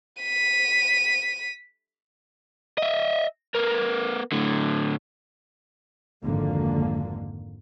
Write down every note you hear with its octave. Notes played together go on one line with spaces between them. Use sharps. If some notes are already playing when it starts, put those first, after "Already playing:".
B6 D#7
D#5 E5
B3 A#4
A2 D3
G#1 F2 D3 A#3